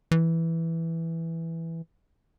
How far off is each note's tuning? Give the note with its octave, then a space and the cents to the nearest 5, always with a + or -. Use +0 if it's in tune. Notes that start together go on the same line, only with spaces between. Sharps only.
E3 +0